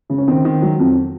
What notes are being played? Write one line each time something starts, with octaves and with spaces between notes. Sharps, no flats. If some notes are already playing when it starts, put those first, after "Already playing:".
C#3
C#4
D#3 C4
D#3
F#3
F2